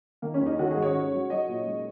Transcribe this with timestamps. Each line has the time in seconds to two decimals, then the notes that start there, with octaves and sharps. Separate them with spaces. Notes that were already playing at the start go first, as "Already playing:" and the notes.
0.22 D#3 A#3
0.34 C#4
0.41 D#2
0.46 D#4
0.59 D#3 F#4
0.71 G#4
0.77 G#2
0.82 C#5
0.95 C#4
1.13 F#3
1.30 F#3 D#5
1.48 A#2
1.66 G#3